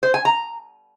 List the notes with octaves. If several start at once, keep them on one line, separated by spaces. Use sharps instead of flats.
C5
G#5
A#5